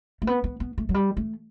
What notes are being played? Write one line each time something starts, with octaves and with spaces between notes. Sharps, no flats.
A3
B3
B3
B3
A3
F#3
G3
A3